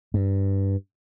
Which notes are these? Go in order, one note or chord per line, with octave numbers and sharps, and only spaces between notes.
G2